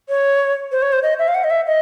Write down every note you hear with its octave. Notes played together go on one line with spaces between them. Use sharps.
C#5
C5
C#5
C5
D#5
E5
F5
F#5
D#5
E5
D#5